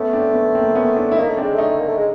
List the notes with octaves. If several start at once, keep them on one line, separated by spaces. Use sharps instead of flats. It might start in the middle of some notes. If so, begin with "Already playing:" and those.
Already playing: A3 B3 C#4
C4 D4
B3 C#4
A#3 C4
B3 C#4
D4 E4
E4
A#3 C#4 D#4
A3
G#3 C4 D4
A3 C#4 D#4
A#3
A3
G#3